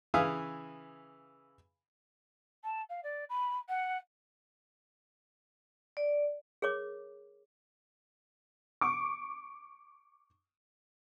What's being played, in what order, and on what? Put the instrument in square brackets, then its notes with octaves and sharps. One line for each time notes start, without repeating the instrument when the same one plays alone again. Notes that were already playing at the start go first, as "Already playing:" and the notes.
[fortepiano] C#3 E3 E5 F5 G#5 D#6
[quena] A5
F5
D5
B5
F#5
[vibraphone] D5
[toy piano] G#4 A#4 C#5 D6
[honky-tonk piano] C#6 D6